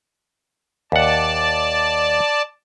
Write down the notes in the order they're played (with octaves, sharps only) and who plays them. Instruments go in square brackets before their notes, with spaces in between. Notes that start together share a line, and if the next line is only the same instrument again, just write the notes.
[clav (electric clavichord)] D#2 F#5 [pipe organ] D5 A5